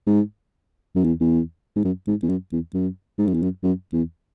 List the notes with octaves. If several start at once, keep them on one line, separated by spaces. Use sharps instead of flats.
G#2
F#2
E2
E2
G#2
F#2
G#2
E2
F#2
E2
F#2
G#2
F#2
E2
F#2
F#2
E2